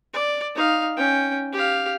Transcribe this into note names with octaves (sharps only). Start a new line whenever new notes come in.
D5
D#4 F5
C#4 G5
G4 F5